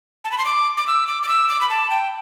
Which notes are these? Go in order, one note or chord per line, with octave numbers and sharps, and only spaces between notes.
A5
B5
C6
D6
D6
E6
D6
D6
E6
D6
B5
A5
G5